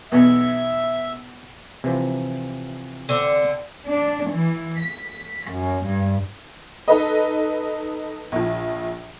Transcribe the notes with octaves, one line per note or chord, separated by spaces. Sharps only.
B1 E2 E5
C3 E3 F3
D3 C4
D4
E3
B6
F#2
G2
D#4 A4 B4 D#5
A#1 F3